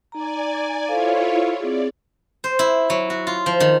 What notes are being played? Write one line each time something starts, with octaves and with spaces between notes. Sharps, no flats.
D#4 D5 G#5 A#5
E4 F4 A4 C5 C#5 F5
C4 G#4 D5
C5
E4
F#3
F#4
F4
F3
D#3